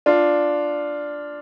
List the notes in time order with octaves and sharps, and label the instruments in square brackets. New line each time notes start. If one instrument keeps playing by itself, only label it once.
[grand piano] D4 F4